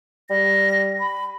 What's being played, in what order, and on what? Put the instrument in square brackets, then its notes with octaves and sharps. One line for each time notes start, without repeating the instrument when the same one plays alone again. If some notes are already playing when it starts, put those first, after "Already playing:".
[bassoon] G3 [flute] A#6
[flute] B5